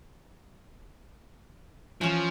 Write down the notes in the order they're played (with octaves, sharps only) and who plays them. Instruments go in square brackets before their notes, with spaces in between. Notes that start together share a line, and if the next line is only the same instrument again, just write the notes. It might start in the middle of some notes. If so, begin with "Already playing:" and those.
[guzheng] E3 C#4 [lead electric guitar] F3